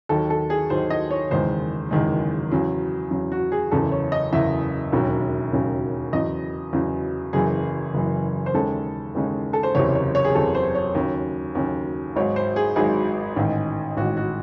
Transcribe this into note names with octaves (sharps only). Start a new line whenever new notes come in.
D#2 D#3 F#3 A4
A4
G#4
D#2 D#3 F#3 C5
D#5
C#5
F#1 E2 D#3 G#3 C5
F#1 E2 D#3 G#3
E2 C#3 F#3
E2 C#3 F#3
F#4
G#4
F#1 E2 C#3 A4
C#5
D#5
F#1 E2 C#3 E5
E1 D#2 C#3 F#3
E1 D#2 C#3 F#3
E2 C#3 F#3 D#5
E2 C#3 F#3
F#1 F#2 E3 G#4
F#1 F#2 E3
C5
D#2 C#3 G#3 A4
D#2 C#3 G#3
A4
C5
F#1 E2 C3 C#5
C#5
C#5
G#4
F#1 E2 C3 A4
C5
C#5
D#2 C#3 F#3
D#2 C#3 F#3
G#1 G#2 F#3 C#5
C5
G#4
G#1 G#2 F#3 G#4
A1 G#2 D#3
A1 G#2 D#3 F#4
F#4